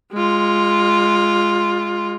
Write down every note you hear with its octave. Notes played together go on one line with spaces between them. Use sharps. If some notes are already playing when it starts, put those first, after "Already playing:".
G#3 F4